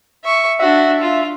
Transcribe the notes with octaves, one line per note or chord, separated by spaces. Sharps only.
E5 C#6
D4 F#4 E5
F4